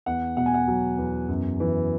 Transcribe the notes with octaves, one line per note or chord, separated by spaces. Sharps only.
E2 F#5
B2 F#5
G#5
F#5
F#3
E2
F#2
E3